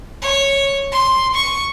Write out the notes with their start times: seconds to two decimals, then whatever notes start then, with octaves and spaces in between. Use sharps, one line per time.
0.22 C#5
0.92 C6
1.34 C#6